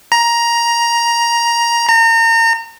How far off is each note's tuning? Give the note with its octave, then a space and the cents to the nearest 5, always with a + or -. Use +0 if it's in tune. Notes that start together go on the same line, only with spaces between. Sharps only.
A#5 +10
A#5 -35